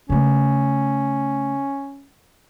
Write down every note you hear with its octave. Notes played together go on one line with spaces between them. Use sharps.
C#3 A3 C#4